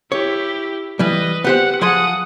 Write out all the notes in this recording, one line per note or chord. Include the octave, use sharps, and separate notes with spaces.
E4 G4 C#5
E3 G3 B4 D#5
B3 G4 C5 F#5
F3 G#4 F#5 C6 D#6